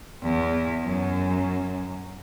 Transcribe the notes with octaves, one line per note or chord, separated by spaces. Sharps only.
E2
F#2